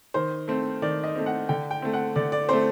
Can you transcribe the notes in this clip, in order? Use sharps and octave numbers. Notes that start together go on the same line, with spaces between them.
D#3 C5
A3 C4
D#3 D5
D#5
A3 C4
F#5
D3 G5
G5
A3 C4
F#5
D3 D5
D5
A3 C4 C5